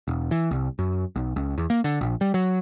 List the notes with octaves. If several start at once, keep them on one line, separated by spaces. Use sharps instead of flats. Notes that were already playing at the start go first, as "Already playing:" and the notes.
E1
E3
C2
F#2
B1
C#2
E2
A#3
D3
A#1
G3
F#3